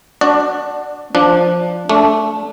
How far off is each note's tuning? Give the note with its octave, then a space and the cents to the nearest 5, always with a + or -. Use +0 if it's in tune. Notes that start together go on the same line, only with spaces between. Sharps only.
D4 +0 F#4 +0 D5 +20
F3 +0 D4 +0
A3 +0 D4 -25